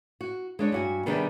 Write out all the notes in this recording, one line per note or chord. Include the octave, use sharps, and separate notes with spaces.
F#4
G#3 D4 C#5
G2 F#4 G#5
C3 D#3 G3 B3 D4 G#4